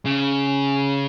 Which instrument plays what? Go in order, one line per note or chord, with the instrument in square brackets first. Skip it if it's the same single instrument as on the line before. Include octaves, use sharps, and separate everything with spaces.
[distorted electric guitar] C#3